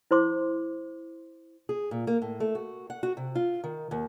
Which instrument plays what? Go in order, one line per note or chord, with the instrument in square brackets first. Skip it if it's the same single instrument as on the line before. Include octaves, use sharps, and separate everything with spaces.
[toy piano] E4 C5 C6 D6
[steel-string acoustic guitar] G#4
A#2
A#3
A2
A3
F#4
F#5
F#4
C3
F4
D#3
D#2